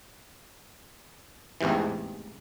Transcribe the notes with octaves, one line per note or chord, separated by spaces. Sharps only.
A1 E2 G#2 C3 E3